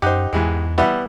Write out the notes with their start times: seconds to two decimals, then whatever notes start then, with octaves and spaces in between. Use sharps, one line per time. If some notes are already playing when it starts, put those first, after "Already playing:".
0.02 F#2 D#4 G4 C5 F#5
0.33 E2 G#2 E3 G#3
0.78 E3 G3 B3 E4 F#5